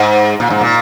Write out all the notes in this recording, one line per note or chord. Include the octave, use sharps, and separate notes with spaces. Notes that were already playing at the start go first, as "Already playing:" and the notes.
Already playing: G#2
A#2
G#2
A#2